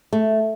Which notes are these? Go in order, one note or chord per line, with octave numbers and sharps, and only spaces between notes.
A3